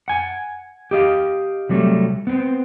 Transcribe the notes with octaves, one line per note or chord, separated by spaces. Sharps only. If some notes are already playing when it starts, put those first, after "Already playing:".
F#5 G#5
G4 D#5 F5
C3 F#3 G3 A3
B3 C4